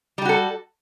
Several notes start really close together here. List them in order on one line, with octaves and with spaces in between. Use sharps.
G3 G4 F#4 A4